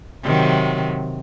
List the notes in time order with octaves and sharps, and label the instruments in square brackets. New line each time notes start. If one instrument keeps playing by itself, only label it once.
[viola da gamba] C3 D#3 F#3